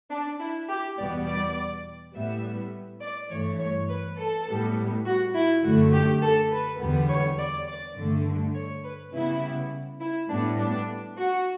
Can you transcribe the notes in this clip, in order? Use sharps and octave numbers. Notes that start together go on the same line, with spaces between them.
D4
E4
G4
E2 B2 G3 B3 D5
D5
A2 G3 B3 E5
D5
G2 E3 A3 C#5
C#5
B4
A4
A2 G3 B3
F#4
E4
F#2 D3 A3 F#4
G4
A4
B4
E2 D3 G3 B3
C#5
D5
D5
G2 D3 A3
C#5
B4
C#3 G3 B3 E4
E4
A2 G3 B3 D4
D4
F#4